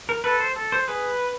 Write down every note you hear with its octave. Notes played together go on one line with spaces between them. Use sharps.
A#4
A4 B4
C5
A4
C5
G#4 B4